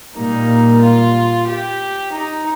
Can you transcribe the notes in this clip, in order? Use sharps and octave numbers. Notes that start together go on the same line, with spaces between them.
A#2 G3 A#3 D#4
F4
G4
D#4